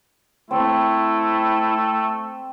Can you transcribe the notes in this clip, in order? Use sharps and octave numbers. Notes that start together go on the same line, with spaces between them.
A3 C4 E4